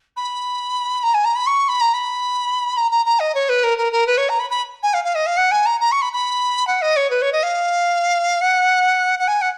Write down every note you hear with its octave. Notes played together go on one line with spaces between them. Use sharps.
B5
A#5
G#5
A#5
B5
C#6
B5
A#5
B5
A#5
A#5
A#5
D#5
C#5
B4
A#4
A#4
A#4
B4
C#5
A#5
B5
B5
G#5
F5
F5
D#5
F5
F#5
G#5
A#5
A#5
C#6
B5
B5
F#5
D#5
C#5
B4
C#5
D#5
F5
F#5
F#5
G#5
F#5